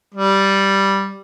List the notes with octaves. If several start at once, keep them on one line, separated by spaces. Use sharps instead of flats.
G3